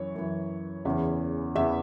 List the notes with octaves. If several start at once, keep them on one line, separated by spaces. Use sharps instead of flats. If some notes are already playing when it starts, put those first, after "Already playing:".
Already playing: F#2 E3 C#5
F#2 E3
E2 C#3 E3
E2 C#3 E3 E5